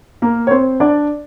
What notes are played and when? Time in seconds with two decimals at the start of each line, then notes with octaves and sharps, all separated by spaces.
0.22 A#3 A#4
0.47 C#5
0.51 C4 C5
0.80 D4 D5